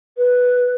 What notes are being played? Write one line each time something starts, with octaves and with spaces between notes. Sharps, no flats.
B4